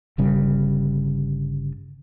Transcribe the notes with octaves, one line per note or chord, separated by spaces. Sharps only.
G1 C#3 G3